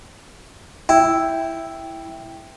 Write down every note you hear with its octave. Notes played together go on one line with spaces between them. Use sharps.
E4 G5